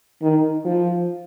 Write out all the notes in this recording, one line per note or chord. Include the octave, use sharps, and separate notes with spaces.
D#3
F3